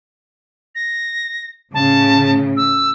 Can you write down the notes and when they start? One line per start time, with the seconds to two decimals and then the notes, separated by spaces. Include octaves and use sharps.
0.75 A#6
1.74 A2 C#3 A5
2.57 E6